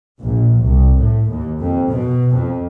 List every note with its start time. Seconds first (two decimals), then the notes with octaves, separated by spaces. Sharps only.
0.20 A#1
0.59 C2
0.98 A2
1.30 D#2
1.60 F2
1.88 B2
2.33 F2